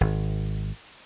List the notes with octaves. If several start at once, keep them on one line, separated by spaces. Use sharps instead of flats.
G#1